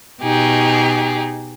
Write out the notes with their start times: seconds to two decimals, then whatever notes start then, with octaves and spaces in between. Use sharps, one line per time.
0.22 B2 D#4 G4 G#4